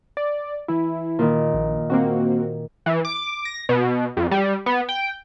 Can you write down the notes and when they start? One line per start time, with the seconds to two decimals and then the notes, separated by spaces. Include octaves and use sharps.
0.17 D5
0.68 E3 E4
1.19 A#2 D#3
1.54 A#1
1.90 A#3 C4 F#4
2.86 E3
3.05 D6
3.45 A#6
3.69 B2
4.17 F2
4.31 G3
4.66 B3
4.89 G5